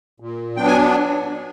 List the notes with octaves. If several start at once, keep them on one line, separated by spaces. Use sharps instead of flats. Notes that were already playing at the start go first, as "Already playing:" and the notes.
A#2
F#3 B3 D4 G5
G#5